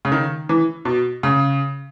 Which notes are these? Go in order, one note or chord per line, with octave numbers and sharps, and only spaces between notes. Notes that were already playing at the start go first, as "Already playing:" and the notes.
C#3
D#3
E3
B2
C#3